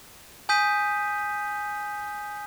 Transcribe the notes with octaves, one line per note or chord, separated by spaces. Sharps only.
G#5 D#6 G6 B6 D#7